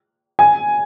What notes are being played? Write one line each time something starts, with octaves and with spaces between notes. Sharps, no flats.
G#5